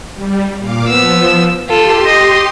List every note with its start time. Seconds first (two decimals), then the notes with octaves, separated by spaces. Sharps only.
0.13 G3
0.59 A#2 F5 D6
0.88 F3 B3 E6
1.69 F4 G4 A4 C6
2.05 D#5